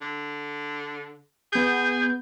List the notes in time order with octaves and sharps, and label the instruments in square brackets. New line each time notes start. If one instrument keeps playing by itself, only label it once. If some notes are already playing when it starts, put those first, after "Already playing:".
[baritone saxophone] D3
[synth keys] B3 G6 [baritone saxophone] G#4